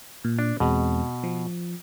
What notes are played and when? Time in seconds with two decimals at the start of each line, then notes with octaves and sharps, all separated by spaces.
0.24 A#2
0.39 D4
0.60 E2 B2 G#3 C4
1.24 F3